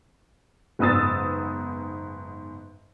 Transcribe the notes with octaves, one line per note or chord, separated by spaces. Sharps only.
F#1 G#2 B3 D#6 E6 A6